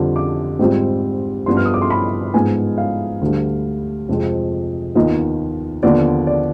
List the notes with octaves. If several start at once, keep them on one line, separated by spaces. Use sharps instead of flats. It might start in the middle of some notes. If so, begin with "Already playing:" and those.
Already playing: F2 D3 G3 D4 F4
D6
G#2 G3 C4 F4
G2 F3 B3 D4 C6
F6
D#6
D6
C6
B5
G#2 F3 G#3 B3 D#4 G#5
F5
D2 D3 G3
F2 C3 F3 G#3 C4
D#2 D#3 B3 F4 D#5
D#2 D3 F3 B3 F4 D5
D5